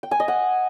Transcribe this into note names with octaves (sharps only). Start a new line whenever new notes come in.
G5
G#5
D#5
F#5